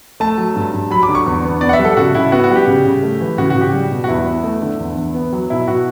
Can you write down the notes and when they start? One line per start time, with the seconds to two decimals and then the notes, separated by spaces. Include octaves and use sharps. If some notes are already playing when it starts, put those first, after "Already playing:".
0.20 A3 A5
0.38 F#3
0.56 G2
0.73 G2
0.91 F#3 B5
1.03 D6
1.09 D3
1.15 C#6
1.26 E2
1.44 B3
1.61 B3 D5
1.69 F#5
1.73 E5
1.79 G3
1.85 A4
1.97 C#3 F#4
2.15 C#3 E4
2.32 B3 F#4
2.44 F#4
2.50 G3
2.56 G4
2.67 C#3
2.85 C#3
3.03 A3
3.21 E3
3.38 C#3 F#4
3.50 C#3 F#4
3.61 G4
3.73 G3
3.91 B2
4.04 F#4
4.08 E2 E4
4.27 B3
4.44 A3
4.62 D3
4.79 E2
4.97 E2
5.15 B3
5.33 F#3
5.50 B2 E4
5.68 B2 F#4